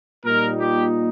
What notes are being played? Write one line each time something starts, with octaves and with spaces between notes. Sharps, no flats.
A#2 G3 D#4 A#4
G4